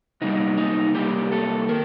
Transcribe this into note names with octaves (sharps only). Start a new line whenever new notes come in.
C3 G3 A#3 D#4
D#4
C3 G3 A#3 G4
A4
D#3 A#4